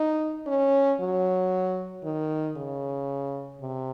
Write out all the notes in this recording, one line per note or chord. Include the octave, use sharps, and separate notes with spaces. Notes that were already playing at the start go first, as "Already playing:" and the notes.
Already playing: D#4
C#4
F#3
D#3
C#3
C3